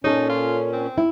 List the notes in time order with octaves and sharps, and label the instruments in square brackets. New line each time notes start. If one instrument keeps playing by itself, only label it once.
[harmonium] A#2 C#4 [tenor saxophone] D#4 [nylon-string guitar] A4 C#5
[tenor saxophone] F4
C4
[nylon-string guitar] E4